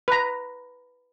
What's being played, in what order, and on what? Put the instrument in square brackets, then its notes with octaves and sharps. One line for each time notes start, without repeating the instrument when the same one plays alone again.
[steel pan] B4 A#5